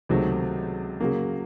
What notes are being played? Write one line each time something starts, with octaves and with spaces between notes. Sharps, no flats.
C#2 C3 D#3 F#3 A3
C#3 F#3 A#3